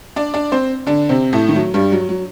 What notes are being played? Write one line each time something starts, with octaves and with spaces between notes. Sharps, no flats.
D4 D5
D4 D5
C4 C5
D3 D4
C3 C4
A2 A3
D#3
F#3
G2 G3
F#3
F#3